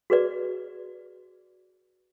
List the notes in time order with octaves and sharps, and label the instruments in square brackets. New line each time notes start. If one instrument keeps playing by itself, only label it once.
[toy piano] F#4 G#4 B4 D5